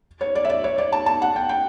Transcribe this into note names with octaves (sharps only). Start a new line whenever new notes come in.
C#5
D5
E5
D5
C#5
D5
A5
A5
F#5
G5
G5